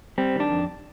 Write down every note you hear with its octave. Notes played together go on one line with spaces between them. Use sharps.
G3 C4
D#3 D4
F2